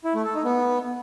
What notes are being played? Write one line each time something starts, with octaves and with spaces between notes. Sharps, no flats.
E4
A3
A4
D#4
B3